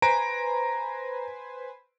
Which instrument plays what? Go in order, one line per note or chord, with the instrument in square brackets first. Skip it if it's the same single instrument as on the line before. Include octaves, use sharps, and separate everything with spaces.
[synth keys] B4 C5 G#5 [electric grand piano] A#5 D7